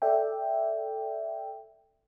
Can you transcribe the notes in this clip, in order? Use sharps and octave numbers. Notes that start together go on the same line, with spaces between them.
A4 D5 E5 G5